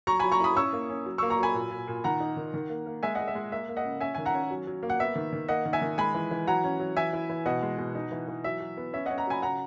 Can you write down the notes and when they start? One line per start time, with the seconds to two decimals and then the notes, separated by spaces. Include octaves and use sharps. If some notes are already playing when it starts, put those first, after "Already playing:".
0.07 F#3 A#5 C#6
0.19 G#5 B5
0.24 F#3
0.32 A#5 C#6
0.40 E4 B5 D#6
0.56 C#4 C#6 E6
0.73 A#3
0.90 C#4
1.06 F#3
1.18 C#6 E6
1.22 A#3
1.30 A#5 C#6
1.39 F#3 G#5 B5
1.54 A#2
1.71 A#2
1.88 A#2
2.04 D#3 F#5 A#5
2.20 D#4
2.37 D#3
2.54 D#3
2.70 A#3
2.86 A#3
3.03 G#3 E5 G#5
3.15 D#5 F#5
3.19 G#3
3.27 E5
3.35 G#3
3.52 A#3 E5
3.69 A#3
3.77 D#5 F#5
3.84 C#3
4.01 C#4 E5 G#5
4.15 D#3 G#5
4.25 F#5 A#5
4.34 C#4
4.51 F#3
4.67 F#3
4.83 A#3
4.90 F#5
4.99 B3 E5
5.16 D#3
5.33 D#3
5.48 A#3 D#5 F#5
5.65 D#3
5.73 E5 G#5
5.82 D#3
5.98 G#3 G#5 B5
6.14 E3
6.31 E3
6.47 F#3 F#5 A#5
6.64 C#4
6.80 F#3
6.96 E3 E5 G#5
7.13 E4
7.29 E3
7.46 B2 D#5 F#5
7.63 G#3
7.79 B2
7.95 D#4
8.12 E3
8.28 E3
8.44 F#3 E5
8.60 F#3
8.77 B3
8.93 C#4 E5
9.06 D#5 F#5
9.10 C#4
9.18 F#5 A#5
9.27 F#3 G#5 B5
9.42 C#3 F#5 A#5